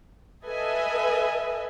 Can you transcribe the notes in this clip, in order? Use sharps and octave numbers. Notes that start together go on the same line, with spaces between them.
A4 B4 D#5 E5 G#5